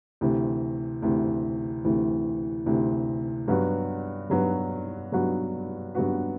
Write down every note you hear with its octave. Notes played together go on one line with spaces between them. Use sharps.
D2 C3 E3
D2 C3 E3
D2 C3 E3
D2 C3 E3
G2 F#3 B3 F#4 B4
G2 F#3 B3 F#4 B4
G2 F#3 B3 F#4 B4
G2 F#3 B3 F#4 B4